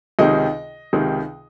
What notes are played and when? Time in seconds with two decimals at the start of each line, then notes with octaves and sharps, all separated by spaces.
0.19 C#2 C3 D#3 D#5
0.93 C#2 C3 D#3